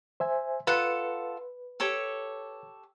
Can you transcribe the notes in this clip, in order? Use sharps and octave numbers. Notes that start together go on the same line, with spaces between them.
C5 E5 G#5
F4 A4 B4 F#5
G4 A4 C#5